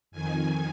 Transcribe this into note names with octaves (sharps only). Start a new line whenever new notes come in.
F2 D#3 G#5